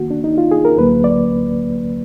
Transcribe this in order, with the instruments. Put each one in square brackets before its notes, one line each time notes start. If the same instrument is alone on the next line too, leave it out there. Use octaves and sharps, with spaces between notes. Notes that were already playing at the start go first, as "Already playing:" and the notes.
Already playing: [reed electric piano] D#2 D#3 A#3 F#4
D4
D#4
F4
G#4
A#4
D2 D3 F#3 A#3 B4
D5